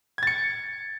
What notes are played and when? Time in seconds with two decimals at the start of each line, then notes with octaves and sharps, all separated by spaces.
0.18 G#6
0.23 A6
0.27 C#7